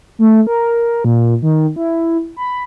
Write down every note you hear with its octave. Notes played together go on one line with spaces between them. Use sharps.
A3
A#4
A#2
D#3
E4
B5